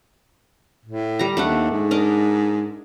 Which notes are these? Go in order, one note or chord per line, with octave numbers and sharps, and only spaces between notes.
A2
G3 A#5
D#2 A3 D4 F#5
G#2
D4 A#4 D#5